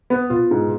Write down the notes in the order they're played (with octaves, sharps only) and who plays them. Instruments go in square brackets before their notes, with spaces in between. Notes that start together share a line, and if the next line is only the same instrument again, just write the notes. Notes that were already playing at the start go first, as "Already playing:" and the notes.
[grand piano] B3
[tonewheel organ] B2 [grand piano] F4
[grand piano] G#2